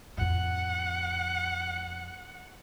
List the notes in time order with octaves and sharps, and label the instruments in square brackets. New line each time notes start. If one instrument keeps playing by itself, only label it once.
[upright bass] F2 A2 [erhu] F#5